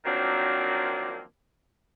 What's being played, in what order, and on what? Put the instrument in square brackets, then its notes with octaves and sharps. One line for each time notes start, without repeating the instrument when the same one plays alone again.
[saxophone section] D#3 F3 F#3 A#3 C4 D4